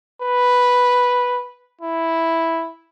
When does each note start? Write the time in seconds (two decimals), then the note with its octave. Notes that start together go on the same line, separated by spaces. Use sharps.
0.22 B4
1.81 E4